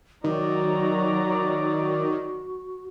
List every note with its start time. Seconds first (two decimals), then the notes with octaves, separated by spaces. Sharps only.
0.24 D#3 F#3 F#4 D5 A#5